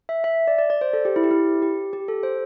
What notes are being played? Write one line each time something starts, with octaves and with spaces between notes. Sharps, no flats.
E5
E5
D5
D5
D5
C5
A4
G4
E4
G4
E4
G4
G4
A4
C5